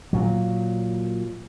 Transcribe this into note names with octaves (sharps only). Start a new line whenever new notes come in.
A#2 F#3